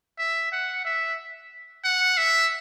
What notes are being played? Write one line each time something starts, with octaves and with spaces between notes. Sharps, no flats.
E5
F#5
E5
F#5
E5